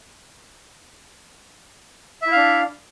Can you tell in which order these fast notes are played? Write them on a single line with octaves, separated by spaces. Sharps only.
E5 E4 F5 D4